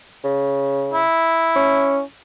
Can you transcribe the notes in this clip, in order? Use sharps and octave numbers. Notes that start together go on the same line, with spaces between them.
C#3
E4
C#4